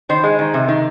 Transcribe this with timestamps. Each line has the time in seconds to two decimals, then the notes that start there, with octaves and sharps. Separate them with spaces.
0.09 D#3 C5
0.24 G#3
0.39 D#3
0.54 C3
0.68 D#3